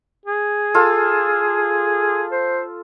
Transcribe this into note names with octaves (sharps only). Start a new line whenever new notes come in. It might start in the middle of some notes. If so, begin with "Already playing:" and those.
G#4
F4 A4
C5